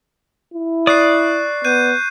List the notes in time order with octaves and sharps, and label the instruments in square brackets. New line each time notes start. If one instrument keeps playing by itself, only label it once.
[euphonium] E4
[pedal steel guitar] D5 D#6 [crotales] C#6 F#6 C7
[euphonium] B3 [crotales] F#6 G6 D#7